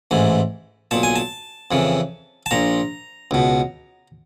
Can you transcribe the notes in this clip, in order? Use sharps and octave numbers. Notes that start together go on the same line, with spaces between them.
A1 G#2 E3
B1 A#2 A5
G#5
A5
F2 C#3 E3
A5
A#1 A#2 A#5
C#2 B2